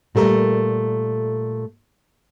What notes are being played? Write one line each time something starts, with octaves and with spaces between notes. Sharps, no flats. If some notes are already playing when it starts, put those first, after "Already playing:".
A#2 G3 A3 A#4